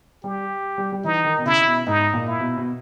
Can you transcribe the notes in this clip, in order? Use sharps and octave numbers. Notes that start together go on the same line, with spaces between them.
G3 G4
G3
G3
E3 D#4
D#3
B2
C#3 E4
B2
G#2 D#4
A#2
E4
B2
B2